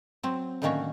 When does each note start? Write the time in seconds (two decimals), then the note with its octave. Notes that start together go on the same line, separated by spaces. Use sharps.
0.23 F#3 C4
0.62 A2 D3 D#3 A#3 C#4 F#4